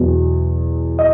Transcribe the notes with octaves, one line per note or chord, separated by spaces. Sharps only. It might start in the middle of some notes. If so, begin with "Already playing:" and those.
Already playing: E2 B2 F#3
D#5